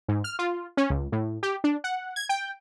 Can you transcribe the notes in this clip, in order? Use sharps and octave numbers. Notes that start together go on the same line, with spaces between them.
G#2
F6
F4
C#4
C#2
A2
G4
D4
F#5
G#6
G5